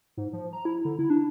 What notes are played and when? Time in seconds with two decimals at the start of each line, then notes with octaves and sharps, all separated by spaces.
0.17 G#2
0.33 F3
0.53 A#5
0.65 E4
0.85 D3
0.99 E4
1.10 D4